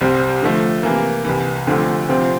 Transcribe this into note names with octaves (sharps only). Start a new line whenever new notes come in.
C2 C3 G3 C4
D3 F3 A3
C3 E3 A#3
C2 C3 E3
D2 D3 F3 A3 C4
D2 C3 F3 C4 F4